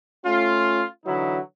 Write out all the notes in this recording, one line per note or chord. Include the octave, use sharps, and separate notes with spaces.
A3 C#4 F4
D3 E3 F#3 D#4 E4